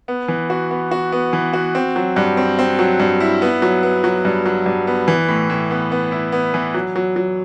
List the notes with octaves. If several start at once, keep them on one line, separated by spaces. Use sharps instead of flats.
B3
E3
F#4
B3
F#4
B3
E3
F#4
C4
F#3
G2
C4
C4
F#3
G2
E4
B3
F#3
B3
F#3
G2
F#3
G2
B3
E3
A2
A2
B3
B3
E4
B3
E3
F#3
F#3
F#3